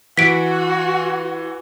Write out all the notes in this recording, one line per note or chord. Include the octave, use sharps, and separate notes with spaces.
E3 F#4 B6 D7